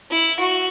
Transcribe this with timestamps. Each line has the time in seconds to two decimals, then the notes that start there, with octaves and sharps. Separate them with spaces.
0.11 E4
0.39 F#4